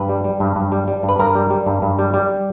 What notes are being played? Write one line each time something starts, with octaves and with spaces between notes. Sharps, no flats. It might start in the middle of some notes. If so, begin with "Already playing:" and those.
Already playing: G2 B4
G3
G3
G2
G2
G3
G3
G2
B4
G2 A#4
G3
G3
G2
G2
G3
G3